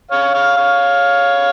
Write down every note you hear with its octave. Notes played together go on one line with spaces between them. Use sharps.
C#5 F5
C#5 F5
C#5 F5